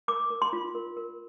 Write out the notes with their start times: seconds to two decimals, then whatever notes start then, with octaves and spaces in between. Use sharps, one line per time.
0.08 A#4 D6
0.30 A#4
0.42 C6
0.53 F4
0.75 A#4
0.97 A#4